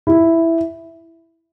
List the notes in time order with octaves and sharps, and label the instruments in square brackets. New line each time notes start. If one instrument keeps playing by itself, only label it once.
[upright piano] E4